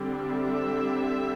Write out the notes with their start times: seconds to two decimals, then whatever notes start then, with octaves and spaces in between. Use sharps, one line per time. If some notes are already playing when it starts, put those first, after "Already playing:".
Already playing: D3 G3 C4
0.20 E5